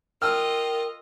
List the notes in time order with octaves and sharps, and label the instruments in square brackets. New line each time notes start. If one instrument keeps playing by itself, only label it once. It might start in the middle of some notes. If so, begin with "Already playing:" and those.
[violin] F4 D#5 [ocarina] A#4 [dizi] G5 [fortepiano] E6 F6